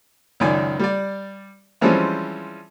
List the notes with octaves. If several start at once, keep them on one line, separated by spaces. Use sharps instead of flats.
C#2 F#2 D#3 D5 G#5
G3 D5
E3 F3 G3 G#3 C4 C#4